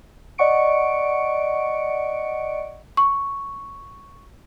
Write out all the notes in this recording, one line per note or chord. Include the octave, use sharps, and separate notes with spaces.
D5 D#5 F#5 C#6 C#7 D7
C#6